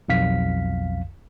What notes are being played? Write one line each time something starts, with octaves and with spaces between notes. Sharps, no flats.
B1 F2 F5 B6